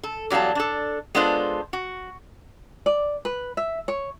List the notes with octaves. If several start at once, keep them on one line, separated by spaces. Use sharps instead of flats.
A4
E2 F#3 G3 F5 A5
D4 A4
G#3 B3 D4 F4 A4 C5
F#4
D5
B4
E5
C#5